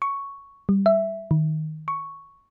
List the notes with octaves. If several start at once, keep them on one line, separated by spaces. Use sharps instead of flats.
C#6
G3
E5
D#3
C#6